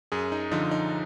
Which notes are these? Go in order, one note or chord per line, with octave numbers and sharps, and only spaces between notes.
F#2 G#4
D#4
D3 F3 D#4
D#4